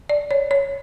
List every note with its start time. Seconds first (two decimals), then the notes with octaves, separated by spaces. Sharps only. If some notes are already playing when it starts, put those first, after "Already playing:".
0.09 D5
0.31 C#5
0.51 C#5